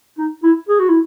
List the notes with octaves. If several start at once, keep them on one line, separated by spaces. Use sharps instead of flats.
D#4
E4
G#4
F#4
E4